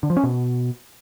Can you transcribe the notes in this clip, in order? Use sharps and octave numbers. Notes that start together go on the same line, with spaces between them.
D3
F3
C#4
B2